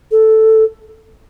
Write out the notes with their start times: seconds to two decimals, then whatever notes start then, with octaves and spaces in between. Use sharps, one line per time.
0.11 A4